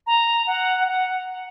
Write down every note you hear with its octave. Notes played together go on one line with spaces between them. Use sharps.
A#5
F#5
F#5